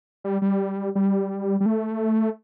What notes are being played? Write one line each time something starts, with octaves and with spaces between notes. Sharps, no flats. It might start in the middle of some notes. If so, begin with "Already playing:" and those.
G3
G3
G3
G3
A3